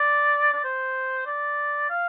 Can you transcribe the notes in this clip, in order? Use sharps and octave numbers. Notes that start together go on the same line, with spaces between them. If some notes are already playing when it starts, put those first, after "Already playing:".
Already playing: D5
D5
C5
D5
F5